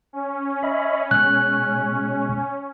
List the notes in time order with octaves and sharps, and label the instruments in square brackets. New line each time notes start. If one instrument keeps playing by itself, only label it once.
[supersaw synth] C#4
[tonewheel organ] D#5 E5 B5
[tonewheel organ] B2 G#3 [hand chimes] F#6